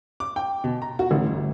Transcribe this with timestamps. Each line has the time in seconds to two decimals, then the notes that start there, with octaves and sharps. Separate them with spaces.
0.20 D6
0.36 G5
0.64 B2
0.82 A#5
0.99 F#4
1.11 A1
1.26 G1